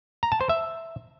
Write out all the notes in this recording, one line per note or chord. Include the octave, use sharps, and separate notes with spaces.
A#5
A5
C5
E5